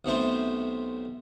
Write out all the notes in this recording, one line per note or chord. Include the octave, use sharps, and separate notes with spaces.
B1 C3 A3 C5